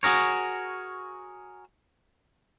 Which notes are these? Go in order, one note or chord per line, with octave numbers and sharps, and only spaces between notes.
F#4 G#4 A#4 C#5